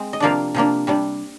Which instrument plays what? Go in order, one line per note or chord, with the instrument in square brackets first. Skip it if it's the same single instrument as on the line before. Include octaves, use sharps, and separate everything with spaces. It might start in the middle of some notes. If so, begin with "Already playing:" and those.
Already playing: [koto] G#3 C4
D#5
C3 F3 A#3 D4 D5 F5
C3 F3 A#3 D4
C3 G3 D4